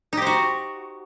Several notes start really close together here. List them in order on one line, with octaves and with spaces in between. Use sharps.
D#4 G4 C5 F#4